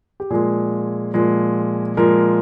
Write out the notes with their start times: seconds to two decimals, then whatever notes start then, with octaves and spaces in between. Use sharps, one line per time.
0.20 G4
0.30 A#2 F3 G#3 G#4
1.14 A#2 F3 G#3
1.97 A#2 F3 G#3 A#4